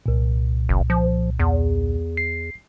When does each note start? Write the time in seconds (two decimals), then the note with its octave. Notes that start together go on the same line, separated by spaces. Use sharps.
0.06 C2 A#2
0.69 F#1
0.90 F3
1.39 E2
2.17 C7